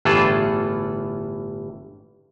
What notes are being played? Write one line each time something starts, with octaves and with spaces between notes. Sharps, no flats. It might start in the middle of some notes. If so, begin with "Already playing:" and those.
G1 A2 E3 F4 G#4 A4